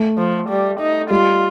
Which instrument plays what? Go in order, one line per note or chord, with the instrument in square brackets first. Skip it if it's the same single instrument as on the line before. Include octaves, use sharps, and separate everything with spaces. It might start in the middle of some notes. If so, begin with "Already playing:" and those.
Already playing: [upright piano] A3
[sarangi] F3
G3
D#4
[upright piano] G3 [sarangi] F4